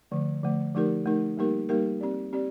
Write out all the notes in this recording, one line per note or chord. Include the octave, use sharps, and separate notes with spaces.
D3 F3 A3
D3 F3 A3
F3 A3 D#4 G4 A#4
F3 A3 D#4 G4 A#4
G3 A#3 D#4 G4 A#4
G3 A#3 D#4 G4 A#4
C4 G4 D5
C4 G4 D5